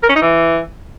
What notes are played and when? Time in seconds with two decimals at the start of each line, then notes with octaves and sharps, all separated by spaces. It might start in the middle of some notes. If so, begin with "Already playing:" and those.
0.03 A#4
0.09 C#4
0.16 D#4
0.22 E3